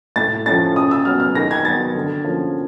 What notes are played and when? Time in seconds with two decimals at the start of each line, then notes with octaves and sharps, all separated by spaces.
0.16 A2 A6
0.46 F3 A3 C#4 A6
0.76 C#3 D#6
0.91 E6
1.05 F#3 B3 F6
1.20 F6
1.35 D#3 A#6
1.51 G#6
1.65 F#3 B3 A6
1.95 D3
2.24 F3 A#3 C#4